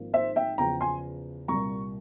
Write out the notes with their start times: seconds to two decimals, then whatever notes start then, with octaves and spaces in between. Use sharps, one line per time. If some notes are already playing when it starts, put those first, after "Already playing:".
Already playing: G#1 G#2 F3 A#3
0.13 C5 E5
0.36 E5 G5
0.58 E2 C#3 F3 G5 A#5
0.81 G#5 C6
1.48 C2 A#2 G3 A#5 C#6